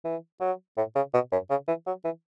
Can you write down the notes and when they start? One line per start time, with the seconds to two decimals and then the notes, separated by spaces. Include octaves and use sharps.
0.05 E3
0.41 F#3
0.77 A2
0.95 C#3
1.14 B2
1.32 F#2
1.50 C#3
1.68 E3
1.87 F#3
2.04 E3